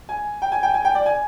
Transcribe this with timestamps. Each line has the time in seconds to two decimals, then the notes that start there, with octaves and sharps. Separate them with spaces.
0.09 G#5
0.42 G5
0.52 G#5
0.63 G5
0.74 G#5
0.85 G5
0.95 D5
1.06 G#5